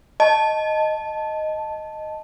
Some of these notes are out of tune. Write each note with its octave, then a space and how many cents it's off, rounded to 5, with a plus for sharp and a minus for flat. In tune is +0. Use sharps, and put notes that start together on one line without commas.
D#5 +0 A5 +0